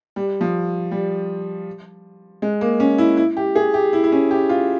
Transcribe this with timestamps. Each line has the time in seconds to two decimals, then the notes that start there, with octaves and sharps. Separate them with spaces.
0.16 G3
0.41 F3
0.91 G3
2.42 G#3
2.61 A#3
2.80 C#4
2.98 E4
3.17 E4
3.37 G4
3.55 G#4
3.74 G4
3.93 E4
4.04 E4
4.12 C#4
4.31 G4
4.49 F4